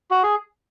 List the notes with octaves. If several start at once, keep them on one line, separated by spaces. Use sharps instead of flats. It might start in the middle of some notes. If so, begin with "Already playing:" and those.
F#4
G#4